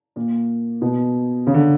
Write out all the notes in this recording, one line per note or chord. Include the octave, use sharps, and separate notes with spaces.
A#2
B2
C#3
D3